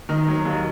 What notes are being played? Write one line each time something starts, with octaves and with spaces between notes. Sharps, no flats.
D#3 D#5
F#3
D#2